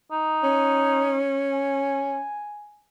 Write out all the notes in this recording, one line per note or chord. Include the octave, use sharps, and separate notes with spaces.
D#4
C#4
G#5